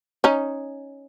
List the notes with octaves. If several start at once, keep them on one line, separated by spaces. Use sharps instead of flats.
C#4 D#4